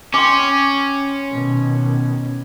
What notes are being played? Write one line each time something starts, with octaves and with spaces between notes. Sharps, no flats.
C#4 G5 C6 D6
B2 D#3